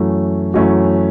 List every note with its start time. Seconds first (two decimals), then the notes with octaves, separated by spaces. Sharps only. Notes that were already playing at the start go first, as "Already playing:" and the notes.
Already playing: F#2 E3 A3 C#4 F#4
0.54 F#2 E3 A3 C#4 F#4